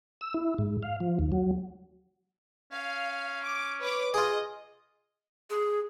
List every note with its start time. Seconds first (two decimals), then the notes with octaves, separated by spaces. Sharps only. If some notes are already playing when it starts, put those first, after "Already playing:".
0.21 E6
0.34 E4
0.58 G#2
0.83 F5
1.00 F3
1.19 D#2
1.32 F#3
2.72 C#4 F5
3.44 D6
3.81 B4 C#5 D6
4.14 F4 G#4 D#5
5.50 G#4